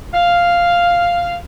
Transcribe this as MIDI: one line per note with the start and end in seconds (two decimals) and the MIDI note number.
0.14 1.36 77